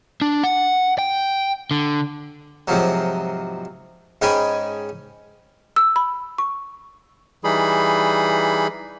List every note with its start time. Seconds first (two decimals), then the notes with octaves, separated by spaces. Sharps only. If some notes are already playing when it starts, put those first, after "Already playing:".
0.22 D4
0.44 F#5
0.99 G5
1.71 D3
2.68 G#2 C3 F3 F#3
4.22 G#2 G#3 C#4 G5 G#5 B5
5.76 E6
5.96 B5
6.38 C#6
7.44 E3 G3 D#4 G#4 B5